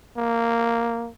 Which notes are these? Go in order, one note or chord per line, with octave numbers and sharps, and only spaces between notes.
A#3